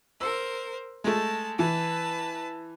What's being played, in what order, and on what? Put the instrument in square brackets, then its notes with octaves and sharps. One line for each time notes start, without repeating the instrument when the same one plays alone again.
[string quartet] A#4 C5 [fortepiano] E6
[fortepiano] G#3 A3 [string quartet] A5
[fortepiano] E3 [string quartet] B4 A5